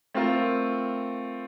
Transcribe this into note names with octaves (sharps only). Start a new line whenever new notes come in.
A3 C4 F4 A#4